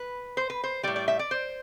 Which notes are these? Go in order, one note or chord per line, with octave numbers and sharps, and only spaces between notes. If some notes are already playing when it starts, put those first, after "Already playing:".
Already playing: B4
C5
B4
C5
A2 G3 D5
D5
E5
D5
C5